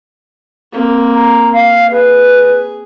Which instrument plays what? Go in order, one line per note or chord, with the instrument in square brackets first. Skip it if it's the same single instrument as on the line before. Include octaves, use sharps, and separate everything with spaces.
[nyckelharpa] A#3 C4
[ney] A#5
F5
[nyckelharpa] G#4 [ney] B4